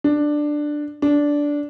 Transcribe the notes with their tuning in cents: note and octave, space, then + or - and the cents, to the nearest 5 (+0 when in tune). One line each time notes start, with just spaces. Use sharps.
D4 +10
D4 -10